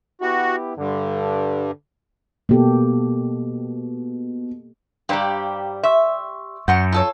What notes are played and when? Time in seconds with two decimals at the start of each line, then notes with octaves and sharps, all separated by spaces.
0.21 B3 E4 F#4 G4
0.77 G2 D3
2.49 B2 A#3 G4 A4
5.09 G2 G3 G4 C5 D5 F5 G5 A#5
5.83 E5 C6 C#6 E6
6.68 F#2 F#5 C6 C#6 G6 C#7
6.92 F4 A4 C#5